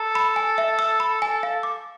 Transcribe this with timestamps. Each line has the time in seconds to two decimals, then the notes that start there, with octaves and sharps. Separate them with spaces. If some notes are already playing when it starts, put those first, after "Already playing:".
Already playing: A4 A#5
0.15 B5
0.36 G#5
0.58 E5
0.79 E6
1.00 B5
1.22 G#5
1.43 F5
1.63 D6